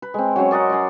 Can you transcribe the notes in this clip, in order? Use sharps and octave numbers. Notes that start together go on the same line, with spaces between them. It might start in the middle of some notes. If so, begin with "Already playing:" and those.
B4
G#3 C4
F#3 C#4 C5 C#5
A#4 D5 D#5 F#5
D5 F#5 G#5 C6